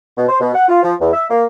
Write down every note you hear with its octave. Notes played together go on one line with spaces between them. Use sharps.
B2
C5
B2
F#5
F4
F3
E2
E5
A#3